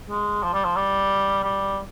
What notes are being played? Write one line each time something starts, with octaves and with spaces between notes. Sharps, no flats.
G#3
F3
G3
F3
G3
G3